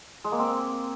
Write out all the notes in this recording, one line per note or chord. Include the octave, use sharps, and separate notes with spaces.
G#3
A#3
C4